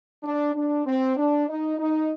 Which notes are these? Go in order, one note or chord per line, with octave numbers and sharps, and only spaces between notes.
D4
D4
C4
D4
D#4
D#4